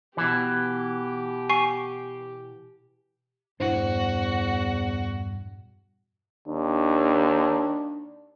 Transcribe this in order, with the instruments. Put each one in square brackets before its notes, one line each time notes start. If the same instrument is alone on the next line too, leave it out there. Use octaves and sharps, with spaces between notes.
[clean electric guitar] B2 E3 [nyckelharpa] G4
[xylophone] G#5 C#6 C7
[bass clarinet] E2 [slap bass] G2 A#2 E3 [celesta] D4 E4 C5 [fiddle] F#4
[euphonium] D#2 [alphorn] D4